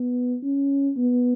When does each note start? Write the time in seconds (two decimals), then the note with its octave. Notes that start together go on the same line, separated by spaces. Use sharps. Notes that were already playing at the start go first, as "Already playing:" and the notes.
Already playing: B3
0.43 C#4
0.97 B3